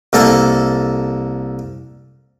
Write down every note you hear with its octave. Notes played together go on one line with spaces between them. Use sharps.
C2 A#3 A4 A5